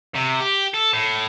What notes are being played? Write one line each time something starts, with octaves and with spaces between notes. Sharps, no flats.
C3
G4
A4
A2